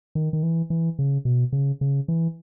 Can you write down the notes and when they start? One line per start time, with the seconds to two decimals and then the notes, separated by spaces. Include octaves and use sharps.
0.15 D#3
0.33 D#3
0.43 E3
0.70 E3
0.99 C#3
1.25 B2
1.52 C#3
1.81 C#3
2.08 E3